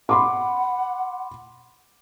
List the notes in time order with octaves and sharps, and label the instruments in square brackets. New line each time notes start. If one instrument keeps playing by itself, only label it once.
[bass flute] F#5 [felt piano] B5 C6 D6